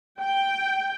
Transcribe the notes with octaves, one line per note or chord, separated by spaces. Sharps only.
G5